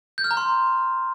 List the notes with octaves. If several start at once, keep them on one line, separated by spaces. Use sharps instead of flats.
G6
F6
A#5
C6